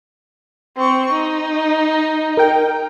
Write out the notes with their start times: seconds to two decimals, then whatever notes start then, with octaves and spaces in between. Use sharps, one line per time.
0.77 C4 C#6
1.12 D#4
2.37 A#4 G5